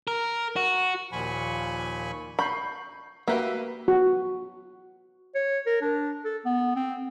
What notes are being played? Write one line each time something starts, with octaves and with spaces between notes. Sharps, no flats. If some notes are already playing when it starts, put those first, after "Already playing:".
A#4
F#4
D#2 A#2 F3 G#5 B5 C#6
B5 C#6 G6 C7
A#3 F#4 G4 B4 E5
F#4
C#5
A#4
D4
A4
B3
C4